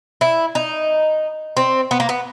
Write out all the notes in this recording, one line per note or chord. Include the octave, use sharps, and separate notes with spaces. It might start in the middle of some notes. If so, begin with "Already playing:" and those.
E4
D#4
C4
B3
A#3
B3